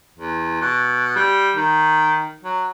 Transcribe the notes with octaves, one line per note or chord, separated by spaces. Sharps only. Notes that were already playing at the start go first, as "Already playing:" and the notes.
E2
B2
G3
D#3
F#3